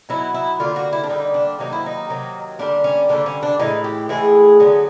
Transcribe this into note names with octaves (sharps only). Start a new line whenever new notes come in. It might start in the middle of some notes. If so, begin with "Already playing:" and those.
B2 F#3 B3 E4
E4
D3 G3 A#3 F4
F#4
E4
D4
D3 G3 A#3 D#4
D4
C3 D#3 F#3 A#3 D#4
E4
D#4
C3 D#3 F#3 A#3
D3 G3 A#3 D4
C#4
D3 G3 A#3 D4
C#4
D4
A2 E3 G#3 D#4
G4
A2 E3 G#3 G#4
D3 F#3 B3